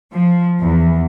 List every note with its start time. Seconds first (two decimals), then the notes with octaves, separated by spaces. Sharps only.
0.14 F3
0.60 E2